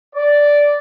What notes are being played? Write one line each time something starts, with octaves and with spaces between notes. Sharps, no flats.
D5